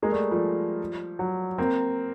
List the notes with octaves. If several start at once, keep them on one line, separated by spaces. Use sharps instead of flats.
G#3 A#3
G3 A3
F3 G3
F#3
A#3 C4